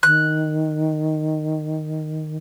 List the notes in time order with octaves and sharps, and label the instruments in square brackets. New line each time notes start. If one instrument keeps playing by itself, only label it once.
[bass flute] D#3 [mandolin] F#6